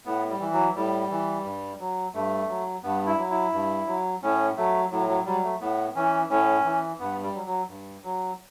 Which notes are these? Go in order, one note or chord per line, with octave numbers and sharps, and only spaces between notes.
A2 B3
G3
E3
F#3
A2 G3
E3
G2
F#3
G2 A3
F#3
G2 B3
E4
F#3
E4
G2
F#3
A2 C#4
F#3 A3
A2 F#3
F#3
F#3 G3
A3
A2 B3
E3 C#4
A2 C#4
E3
G2 B3
G3
F#3
F#3
G2
F#3